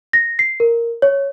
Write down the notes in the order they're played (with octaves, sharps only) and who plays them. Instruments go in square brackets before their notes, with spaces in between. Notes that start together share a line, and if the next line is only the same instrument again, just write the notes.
[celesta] A#6
C7
A#4
C#5